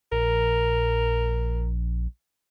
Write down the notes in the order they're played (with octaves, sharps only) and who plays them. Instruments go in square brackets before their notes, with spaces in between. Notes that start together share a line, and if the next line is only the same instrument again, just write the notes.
[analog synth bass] A#1 [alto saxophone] A#4